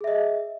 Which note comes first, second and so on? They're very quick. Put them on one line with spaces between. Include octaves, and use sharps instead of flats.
G#4 E5 D#5